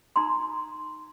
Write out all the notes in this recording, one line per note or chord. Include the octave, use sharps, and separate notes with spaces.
D#4 A#5 C6